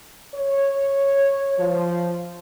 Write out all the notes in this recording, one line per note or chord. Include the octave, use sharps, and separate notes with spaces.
C#5
F3